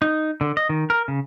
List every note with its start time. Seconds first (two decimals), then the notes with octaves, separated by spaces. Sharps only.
0.02 D#4
0.41 D3
0.57 D#5
0.69 D#3
0.90 A#4
1.08 C#3